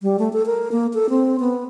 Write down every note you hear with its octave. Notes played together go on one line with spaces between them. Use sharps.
G3
A3
A4
A#4
A#3
A4
C4
B3